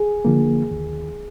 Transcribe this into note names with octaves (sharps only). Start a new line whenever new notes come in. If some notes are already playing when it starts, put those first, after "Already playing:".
Already playing: G#4
D3 F3 A#3
D#2